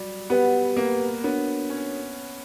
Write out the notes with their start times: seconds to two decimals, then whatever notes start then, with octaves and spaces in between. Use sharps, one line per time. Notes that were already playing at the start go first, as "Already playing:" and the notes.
Already playing: F#3 G3
0.30 B3 G4 B4 F#5
0.76 A#3
1.24 B3 D4 F#4 A#4 C#5
1.70 C#4